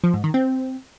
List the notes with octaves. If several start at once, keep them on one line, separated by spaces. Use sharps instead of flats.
F3
G#2
D#3
C4